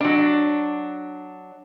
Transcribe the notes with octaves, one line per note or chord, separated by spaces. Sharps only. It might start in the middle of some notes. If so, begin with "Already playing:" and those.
F#3 D4